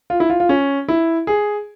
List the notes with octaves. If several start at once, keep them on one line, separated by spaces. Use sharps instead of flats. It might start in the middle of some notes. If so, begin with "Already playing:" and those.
F4
E4
F4
F4
C#4
E4
G#4